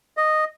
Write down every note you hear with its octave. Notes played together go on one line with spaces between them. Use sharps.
D#5